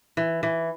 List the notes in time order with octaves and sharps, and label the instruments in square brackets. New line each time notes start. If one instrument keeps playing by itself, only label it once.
[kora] E3
E3